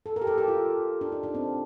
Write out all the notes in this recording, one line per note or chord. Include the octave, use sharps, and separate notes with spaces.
A4
A#4
G4
A4
G4
F4
D4
D#4
D4
C4